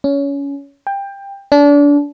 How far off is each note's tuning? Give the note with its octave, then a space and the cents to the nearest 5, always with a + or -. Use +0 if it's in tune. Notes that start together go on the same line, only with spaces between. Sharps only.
C#4 +20
G5 +20
D4 -30